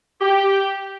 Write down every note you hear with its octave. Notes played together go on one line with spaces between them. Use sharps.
G4